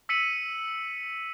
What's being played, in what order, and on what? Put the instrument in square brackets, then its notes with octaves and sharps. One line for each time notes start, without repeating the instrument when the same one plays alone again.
[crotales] E6 B6 C#7 D#7 F#7